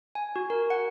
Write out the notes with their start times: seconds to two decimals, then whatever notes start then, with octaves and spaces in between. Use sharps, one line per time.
0.15 G#5
0.36 F#4
0.50 A#4
0.70 F#5